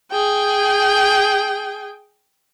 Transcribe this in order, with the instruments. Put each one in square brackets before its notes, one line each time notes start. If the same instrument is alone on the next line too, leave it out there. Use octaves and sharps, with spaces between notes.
[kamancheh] G#4 G5